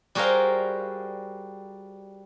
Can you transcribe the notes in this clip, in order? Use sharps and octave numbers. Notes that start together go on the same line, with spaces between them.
G3 F#4 G#4 A#4 C5 F5